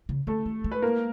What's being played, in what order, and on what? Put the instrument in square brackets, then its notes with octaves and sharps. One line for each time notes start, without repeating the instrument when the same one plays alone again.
[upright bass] C#3
[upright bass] D3 [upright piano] A3 A4
[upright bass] D#3
G#3
[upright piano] B4
A#3 A#4